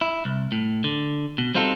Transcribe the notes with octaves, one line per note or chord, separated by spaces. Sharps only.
E4
C2
A2
D3
B2
G3 C4 D#4 F4 F#4 A4